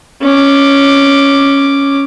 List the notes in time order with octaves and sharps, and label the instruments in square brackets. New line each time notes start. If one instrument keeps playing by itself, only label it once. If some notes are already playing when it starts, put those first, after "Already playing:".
[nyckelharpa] C#4 D6